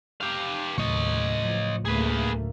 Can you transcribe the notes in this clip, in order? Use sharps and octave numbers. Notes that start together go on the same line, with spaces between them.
G4 F5
D#2 A2 C#3 F#3 C#5 D#5
F3
D2 A3 A#3 G#4 B4